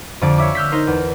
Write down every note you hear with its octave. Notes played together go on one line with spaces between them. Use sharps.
F2 D3 D5 D6
C#5 E5 D6
E6 F6 G6 B6
D#4 A#4 C5
E2